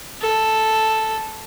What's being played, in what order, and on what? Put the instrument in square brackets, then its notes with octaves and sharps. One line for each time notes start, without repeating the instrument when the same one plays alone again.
[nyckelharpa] A4